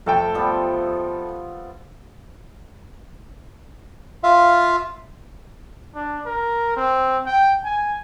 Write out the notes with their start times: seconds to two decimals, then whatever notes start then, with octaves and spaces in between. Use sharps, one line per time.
0.06 F2 A3 C4 A4 G5
0.34 F3 G3 B3
4.23 F4 E5 F5
5.95 D4
6.26 A#4
6.77 C4
7.26 G5
7.64 G#5